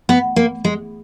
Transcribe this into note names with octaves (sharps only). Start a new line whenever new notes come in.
B3
A#3
G#3